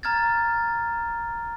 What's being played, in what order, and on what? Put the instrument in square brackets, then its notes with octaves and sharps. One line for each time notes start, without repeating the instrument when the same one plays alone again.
[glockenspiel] A#5 F6 G#6 A6